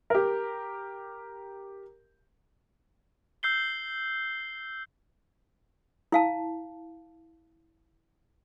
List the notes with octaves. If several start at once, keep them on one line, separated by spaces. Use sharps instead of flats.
G4 A#4
E6 G6 C7 G7
E4 F5 A5